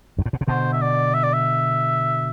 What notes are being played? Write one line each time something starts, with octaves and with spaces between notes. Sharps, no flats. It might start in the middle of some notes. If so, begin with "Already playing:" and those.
G2
A2
B2
C3
B2 D3 C5
E5
D5
E5
D5
E5